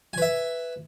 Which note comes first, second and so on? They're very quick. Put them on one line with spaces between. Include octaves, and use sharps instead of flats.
G#5 B4 E5